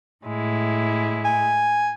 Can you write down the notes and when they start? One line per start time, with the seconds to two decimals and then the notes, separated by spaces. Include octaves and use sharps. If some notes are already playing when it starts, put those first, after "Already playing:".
0.24 A2 G#3 E4
1.25 G#5